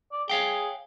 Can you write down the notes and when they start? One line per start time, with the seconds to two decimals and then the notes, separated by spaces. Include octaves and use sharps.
0.12 D5
0.30 G#4 C#5 F5 G5